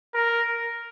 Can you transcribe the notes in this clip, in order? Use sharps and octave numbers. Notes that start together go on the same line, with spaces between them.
A#4